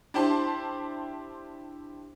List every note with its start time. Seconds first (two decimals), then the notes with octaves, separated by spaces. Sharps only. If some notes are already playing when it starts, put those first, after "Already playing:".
0.14 D4 E4 G4 C5 A5 C6